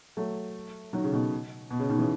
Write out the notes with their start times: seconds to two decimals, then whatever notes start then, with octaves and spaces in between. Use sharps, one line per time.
0.17 F#3 A3
0.93 D#3 F#3
1.04 C#3
1.12 B2 D#3
1.71 B2
1.79 C#3
1.90 B2 D#3
1.99 C#3 E3